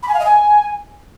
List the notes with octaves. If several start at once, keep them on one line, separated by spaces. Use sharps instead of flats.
B5
G#5
F5
D#5
G#5